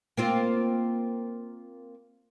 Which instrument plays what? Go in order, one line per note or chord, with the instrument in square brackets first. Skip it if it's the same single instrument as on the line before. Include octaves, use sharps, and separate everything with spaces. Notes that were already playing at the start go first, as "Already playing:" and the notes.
[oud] A#3 C4 F4